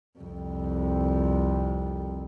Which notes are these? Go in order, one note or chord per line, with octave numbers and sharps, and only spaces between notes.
C2 F2